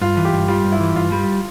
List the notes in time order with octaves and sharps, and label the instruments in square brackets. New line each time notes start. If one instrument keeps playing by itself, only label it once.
[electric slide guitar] G2 [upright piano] F4
[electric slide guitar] E3
[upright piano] G4
[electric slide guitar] G2
[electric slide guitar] G3 [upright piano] F4
[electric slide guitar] G2
[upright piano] E4
[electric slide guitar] E3
[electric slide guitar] G2 [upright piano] F4
[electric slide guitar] G3